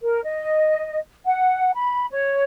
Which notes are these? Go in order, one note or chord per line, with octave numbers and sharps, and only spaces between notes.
A#4
D#5
F#5
B5
C#5